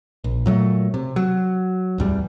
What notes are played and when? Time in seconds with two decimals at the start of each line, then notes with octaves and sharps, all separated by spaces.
0.24 A#1
0.46 A#2 F#3 G#3 A3
0.94 C3
1.16 F#3
1.98 D1 E2 G3